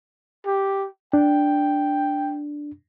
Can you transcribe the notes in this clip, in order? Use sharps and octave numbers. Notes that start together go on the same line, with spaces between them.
G4
D4 G5